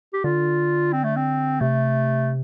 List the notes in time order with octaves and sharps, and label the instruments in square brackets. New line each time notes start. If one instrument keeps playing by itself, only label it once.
[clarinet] G4
[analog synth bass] D3 [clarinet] F4
[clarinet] C4
A3
C4
[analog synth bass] C3 [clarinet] A3